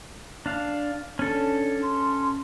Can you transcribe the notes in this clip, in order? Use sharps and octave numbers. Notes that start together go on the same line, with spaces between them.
D4 F5
C#4 D4 A4
C6